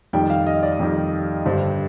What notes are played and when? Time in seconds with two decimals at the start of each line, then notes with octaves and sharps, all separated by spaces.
0.13 F2 D#3 G3 G5
0.30 F5
0.46 D#5
0.63 D5
0.79 F2 D#3 G3
1.45 G2 D3 G3 C5